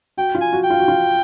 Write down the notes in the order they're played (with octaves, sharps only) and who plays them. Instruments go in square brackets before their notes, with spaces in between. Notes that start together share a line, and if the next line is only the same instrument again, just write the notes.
[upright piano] F#4 [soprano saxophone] G5
[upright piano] F4
[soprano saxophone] G#5
[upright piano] F#4
[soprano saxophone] G5
[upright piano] F4
F#4
F4